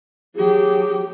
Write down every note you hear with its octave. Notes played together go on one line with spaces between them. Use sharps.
F#3 G4 G#4